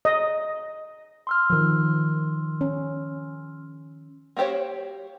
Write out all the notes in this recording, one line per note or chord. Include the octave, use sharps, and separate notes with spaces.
D#5
C6 E6 F6
D#3 F3
C#4
A#3 F#4 G4 C5 C#5